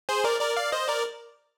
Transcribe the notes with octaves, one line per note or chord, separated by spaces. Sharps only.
G#4 C5
A#4 D5
A#4 D5
D5 F5
C5 D#5
A#4 D5